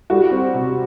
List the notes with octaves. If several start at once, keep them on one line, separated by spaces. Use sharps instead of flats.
G3 F#4
C4
C3